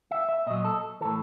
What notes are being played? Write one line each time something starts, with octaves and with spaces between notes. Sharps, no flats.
E5
E5
A#2 F#3 D#5
A4
A2 E3 A4